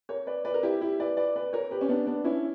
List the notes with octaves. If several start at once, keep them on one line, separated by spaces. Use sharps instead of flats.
A#4 C#5
B4 D5
B4 D5
A#4
E4 G4
E4 G4
B4 D5
B4 D5
B4 D5
A#4 C#5
G4 B4
C#4
B3 D4
B3 D4
C#4 E4